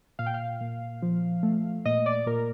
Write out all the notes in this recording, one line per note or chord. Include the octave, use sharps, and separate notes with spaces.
A#2 F5
G5
F5
A#2
F3
A3
A#2 D#5
D5
A#2 A#4